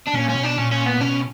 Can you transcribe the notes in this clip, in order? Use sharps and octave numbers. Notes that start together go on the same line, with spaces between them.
D4
A#2 C#4
C#4
B2
D4
A#2 C#4
C#4
B3
B2 C#4